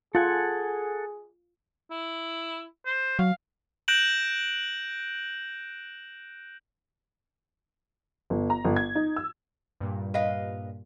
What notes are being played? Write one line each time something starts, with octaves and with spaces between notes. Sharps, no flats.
F4 G#4 A4 F#5 G#5
E4
C5
F#3 F5
F#6 G6 A#6 D7 E7 F#7
G1
A#5
G1
G#6
D#4
E6
G2 A#2
B4 D#5 F5